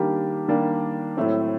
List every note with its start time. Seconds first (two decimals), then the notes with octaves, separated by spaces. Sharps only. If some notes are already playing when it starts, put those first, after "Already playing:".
Already playing: D#3 G3 A#3 D4 G4
0.48 D#3 G3 A#3 D4 G4
1.17 A2 F#3 A3 C4